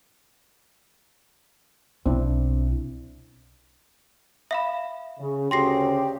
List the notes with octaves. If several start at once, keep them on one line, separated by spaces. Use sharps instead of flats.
B1 C4 D4 E4
E5 F5 B5
C#3
D2 C#3 F#4 G4 C6 A#6 C7